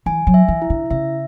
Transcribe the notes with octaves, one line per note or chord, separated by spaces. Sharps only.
E3 G#5
F#3
E5
E3
E4
D3
C#3 E5